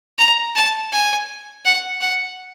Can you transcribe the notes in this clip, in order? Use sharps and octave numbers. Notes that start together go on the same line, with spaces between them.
A#5
A5
G#5
F#5
F#5